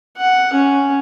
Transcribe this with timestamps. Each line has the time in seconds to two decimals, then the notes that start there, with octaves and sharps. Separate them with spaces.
0.17 F#5
0.54 C#4